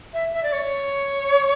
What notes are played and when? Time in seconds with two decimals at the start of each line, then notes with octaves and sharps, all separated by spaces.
0.13 E5
0.33 E5
0.43 D5
0.52 C#5